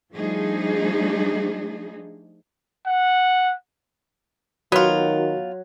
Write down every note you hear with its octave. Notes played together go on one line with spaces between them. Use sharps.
F3 G3 A3 D4 D#4 G#4
F#5
D#3 F#3 B3 F4 F#4